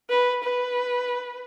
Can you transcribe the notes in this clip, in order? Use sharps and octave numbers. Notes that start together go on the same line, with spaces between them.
B4
B4